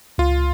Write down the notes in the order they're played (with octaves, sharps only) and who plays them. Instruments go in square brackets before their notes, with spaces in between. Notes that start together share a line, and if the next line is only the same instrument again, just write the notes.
[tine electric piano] C#2 [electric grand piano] F4